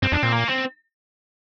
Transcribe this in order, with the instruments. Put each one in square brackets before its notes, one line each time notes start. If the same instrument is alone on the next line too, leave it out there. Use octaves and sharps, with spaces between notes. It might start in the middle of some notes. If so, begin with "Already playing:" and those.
[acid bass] G2 [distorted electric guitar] C4
[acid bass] F2 [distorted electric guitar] D4
[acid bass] A#2 [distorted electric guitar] C4
[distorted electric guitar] A#3
C4